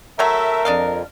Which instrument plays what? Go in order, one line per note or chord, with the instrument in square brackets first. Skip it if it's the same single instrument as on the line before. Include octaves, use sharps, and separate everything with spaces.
[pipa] F#3 A3 A#5 [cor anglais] A#4 [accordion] E5
[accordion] F2 [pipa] D4 D#5 F5